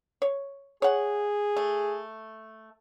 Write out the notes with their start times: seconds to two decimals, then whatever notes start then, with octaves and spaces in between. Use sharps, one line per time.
0.22 C#5
0.82 G#4 C#5 F#5
1.57 A3